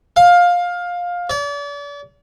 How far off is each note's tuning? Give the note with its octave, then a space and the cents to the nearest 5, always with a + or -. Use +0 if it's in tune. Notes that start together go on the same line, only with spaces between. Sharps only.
F5 +15
D5 -40